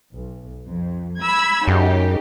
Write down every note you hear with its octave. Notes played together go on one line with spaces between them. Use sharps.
B1
F2
B5 E6 G#6
F#2 C#3 D#4 G4